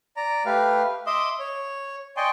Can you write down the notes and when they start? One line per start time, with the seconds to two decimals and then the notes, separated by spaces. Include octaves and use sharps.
0.17 D5 A#5
0.46 A3 G4 B4 F5
1.07 D#5 E5 C6 D6 D#6
1.39 C#5
2.17 D5 D#5 G5 G#5 C6 C#6